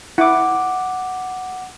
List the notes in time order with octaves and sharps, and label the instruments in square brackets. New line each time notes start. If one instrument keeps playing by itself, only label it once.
[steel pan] E4 [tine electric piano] F#5 D6